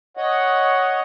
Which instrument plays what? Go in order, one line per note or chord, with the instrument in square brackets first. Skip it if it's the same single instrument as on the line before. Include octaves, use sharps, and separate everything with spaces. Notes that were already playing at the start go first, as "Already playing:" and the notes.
[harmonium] C#5 D#5 F#5